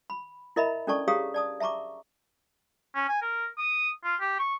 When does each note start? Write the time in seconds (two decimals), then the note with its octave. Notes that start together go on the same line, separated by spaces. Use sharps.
0.10 B5
0.56 E4 A#4 D#5 E5 A#5 B5
0.87 C#4 D4 A4 D5 A5 C#6
1.08 G4 G#4 C#5 F5 A#5 D#6
1.34 D5 A5 D#6
1.60 E5 A5 A#5 C#6 D6
2.95 C#4
3.08 G#5
3.22 A#4
3.58 D#6
4.04 F4
4.21 G4
4.39 C#6